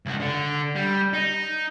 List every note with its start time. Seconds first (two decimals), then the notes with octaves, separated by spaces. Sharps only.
0.06 C#2 F#4
0.20 D3
0.75 G3
1.13 D#4